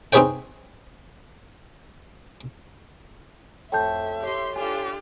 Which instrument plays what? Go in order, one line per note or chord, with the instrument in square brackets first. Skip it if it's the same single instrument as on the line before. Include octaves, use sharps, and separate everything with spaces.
[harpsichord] C4 D#4 G#4 B4 C#5 G5
[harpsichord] F2 A2 A3 [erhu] E5 [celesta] G5 A5 G6
[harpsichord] A2 [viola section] G4 C6
[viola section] D4 F4 A4 [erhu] G4 [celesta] G#5